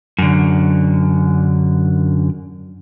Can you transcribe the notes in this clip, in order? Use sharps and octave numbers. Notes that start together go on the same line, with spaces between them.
F#2 D3